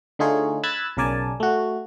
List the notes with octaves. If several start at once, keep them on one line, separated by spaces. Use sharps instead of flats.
D3 A3 D#4 F4 G#4 C#5
B5 E6 F#6 G#6 A6
B1 C#3 A#4 D5 G#5 A5
A3 F#4